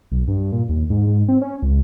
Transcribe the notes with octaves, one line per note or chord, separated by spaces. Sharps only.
B1
G2
A#2
D#2
G#2
G#2
C4
C#4
C#2